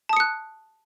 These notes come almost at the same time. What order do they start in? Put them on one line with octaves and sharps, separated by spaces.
A5 D#6 C#7 F#6